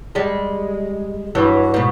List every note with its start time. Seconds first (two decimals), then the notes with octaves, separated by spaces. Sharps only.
0.15 G3 G#3
1.35 G2 E3 F#3
1.74 G#2 B2